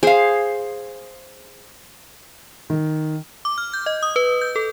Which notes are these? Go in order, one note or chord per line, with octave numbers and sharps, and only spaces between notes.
G#4 C5 F5
D#3
D6
F6
G6
D#5
D#6
B4
G6
A4